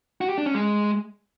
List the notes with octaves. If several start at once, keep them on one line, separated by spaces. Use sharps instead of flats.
F#4
G4
D4
C#4
G#3